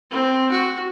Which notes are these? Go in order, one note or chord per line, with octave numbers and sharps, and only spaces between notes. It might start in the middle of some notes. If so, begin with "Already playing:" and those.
C4
F#4